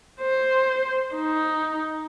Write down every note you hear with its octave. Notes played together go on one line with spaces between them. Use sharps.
C5
D#4